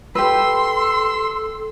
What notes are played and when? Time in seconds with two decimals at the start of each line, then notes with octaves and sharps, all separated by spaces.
0.15 G4 A4 B4 C6 E6